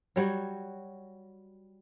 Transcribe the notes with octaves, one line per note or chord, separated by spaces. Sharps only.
F#3 G3 F#4 C#5